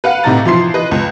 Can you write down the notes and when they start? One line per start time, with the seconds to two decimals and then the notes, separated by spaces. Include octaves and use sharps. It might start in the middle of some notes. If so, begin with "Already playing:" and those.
0.04 B4 F5 F#5
0.24 A2 C3 D#4 A#5 A6
0.45 E3 F3 C6 C7
0.74 B4 D#5
0.91 C#2